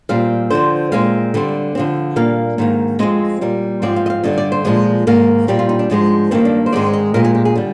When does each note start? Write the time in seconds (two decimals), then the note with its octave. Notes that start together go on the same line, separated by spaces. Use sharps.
0.09 A#2 G3 C4 F5
0.50 D3 F3 C4 C5
0.92 A#2 G#3 C4 F5
1.34 D3 G3 C4
1.75 D3 F3 C4
2.16 A#2 G3 A#3 F5
2.58 G#2 D#3 A#3
2.99 F2 D3 G#3 C4 D#5
3.41 A#2 G3 A#3
3.82 G#2 F3 C4 D5
3.96 F5
4.06 D#5
4.10 F5
4.24 G2 D3 G3 D#5
4.38 D5
4.52 C5
4.65 A#2 F3 G#3
5.07 G#2 D#3 A#3 A#4
5.48 A#2 G3 C4 G4
5.59 F4
5.69 D#4
5.79 D4
5.90 G#2 F3 G#3 C4
6.31 G2 D#3 A#3 C4
6.45 D4
6.66 C5
6.72 G#2 D#3 G#3 C4 D5
6.93 D#5
7.14 A#2 G#3 C4 A#4
7.24 G#4
7.35 G4
7.45 G#4
7.56 D3 G3